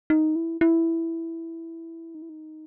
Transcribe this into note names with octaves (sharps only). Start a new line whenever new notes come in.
D#4
E4
E4
D#4
E4
D#4